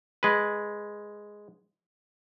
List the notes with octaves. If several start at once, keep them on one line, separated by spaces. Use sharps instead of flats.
G#3 B4